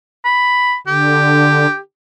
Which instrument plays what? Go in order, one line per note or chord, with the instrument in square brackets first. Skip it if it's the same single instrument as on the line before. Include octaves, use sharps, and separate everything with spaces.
[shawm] B5
[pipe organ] D3 [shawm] G4